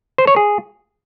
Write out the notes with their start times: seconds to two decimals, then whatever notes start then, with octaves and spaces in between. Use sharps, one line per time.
0.18 C5
0.27 C#5
0.36 G#4